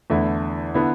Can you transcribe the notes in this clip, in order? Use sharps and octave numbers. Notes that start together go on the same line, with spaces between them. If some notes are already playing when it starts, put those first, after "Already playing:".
E2 D3 A3 E4
D3 B3 E4